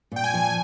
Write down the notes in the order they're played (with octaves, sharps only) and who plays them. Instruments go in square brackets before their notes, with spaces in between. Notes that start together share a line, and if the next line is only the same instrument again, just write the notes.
[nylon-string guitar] A#2 [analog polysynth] G5
[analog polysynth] G#5
[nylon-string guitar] F3